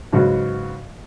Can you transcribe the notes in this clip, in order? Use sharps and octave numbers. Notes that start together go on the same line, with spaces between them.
G#2 C#3 F#3 B3 F#4